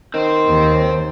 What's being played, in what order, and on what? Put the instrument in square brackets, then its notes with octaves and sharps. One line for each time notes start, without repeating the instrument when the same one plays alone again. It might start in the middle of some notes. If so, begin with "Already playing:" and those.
[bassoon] D#3 [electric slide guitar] C4 C5
[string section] D#2